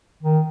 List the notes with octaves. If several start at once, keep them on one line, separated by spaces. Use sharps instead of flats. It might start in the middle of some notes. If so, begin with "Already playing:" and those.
D#3